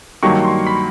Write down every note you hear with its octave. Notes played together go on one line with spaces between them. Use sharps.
G2 D#3 F#3 A#3 C#6
C6
B5